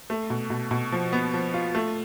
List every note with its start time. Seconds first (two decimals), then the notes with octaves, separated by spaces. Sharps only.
0.10 A3
0.30 B2
0.50 B2
0.71 B2
0.92 F3
1.13 B3
1.34 F3
1.54 F4
1.75 A3